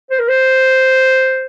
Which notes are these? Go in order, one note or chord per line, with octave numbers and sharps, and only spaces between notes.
C5
A#4
C5